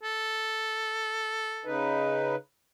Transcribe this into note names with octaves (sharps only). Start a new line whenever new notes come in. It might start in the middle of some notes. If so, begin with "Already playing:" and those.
A4
C#3 D#4 B4